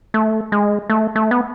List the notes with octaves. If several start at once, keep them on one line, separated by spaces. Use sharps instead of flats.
A3
G#3
A3
A3
B3